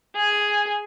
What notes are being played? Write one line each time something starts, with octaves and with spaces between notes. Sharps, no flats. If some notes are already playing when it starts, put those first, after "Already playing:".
G#4 G#5